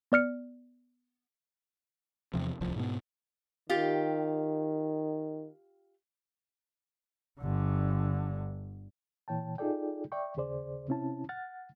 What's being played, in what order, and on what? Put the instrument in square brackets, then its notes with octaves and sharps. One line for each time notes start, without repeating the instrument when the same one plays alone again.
[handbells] B3 D5 F6 C#7
[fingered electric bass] E2 C3 F3
D1 C2 F3
G#2 B2 B3
[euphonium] D#3 [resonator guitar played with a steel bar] F4 G4
[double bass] G1 D3
[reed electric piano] A#2 E3 C#5 G5 A5
D#4 F4 G#4 A4 D5 G5
D5 E5 G5 C#6
D#2 C#3 G#4 C5 D5
C3 C4 C#4 E4 A5
F#5 F6 A6